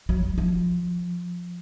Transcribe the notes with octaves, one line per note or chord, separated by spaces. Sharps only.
F#3
F#3
F3